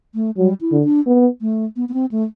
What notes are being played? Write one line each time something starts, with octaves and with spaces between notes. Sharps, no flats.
A3
F#3 G3
E4
D3
D4
B3
A3
B3
B3
C4
A3